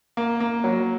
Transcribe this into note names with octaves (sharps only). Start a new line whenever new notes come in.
A#3
A#3
F#3